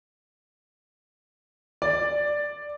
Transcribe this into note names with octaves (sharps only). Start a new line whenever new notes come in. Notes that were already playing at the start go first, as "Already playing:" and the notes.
D5